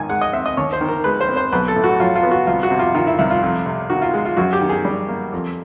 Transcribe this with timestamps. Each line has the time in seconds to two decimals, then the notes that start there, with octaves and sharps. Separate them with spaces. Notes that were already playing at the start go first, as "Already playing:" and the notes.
Already playing: G#2 D#3 G#5
0.09 G#3 F#5
0.21 D#5
0.33 C4 E5
0.46 D#5
0.57 D#2 C#5
0.73 C5
0.81 D#3
0.89 A#4
1.04 G#3 B4
1.21 C5
1.28 C4
1.37 C5
1.52 B1 B4
1.68 A4
1.76 A2
1.84 F#4
2.00 F#3 F4
2.15 F4
2.23 B3
2.31 F#4
2.47 C2 F4
2.63 F#4
2.71 C3
2.79 F4
2.94 D#3 F4
3.07 E4
3.18 C2 E4
3.30 F4
3.42 F2
3.66 C3
3.90 D#3 F#4
4.02 F4
4.14 G#3
4.25 F4
4.37 F#2 F#4
4.53 G4
4.61 D#3
4.69 G#4
4.85 G3
5.08 A#3
5.32 F2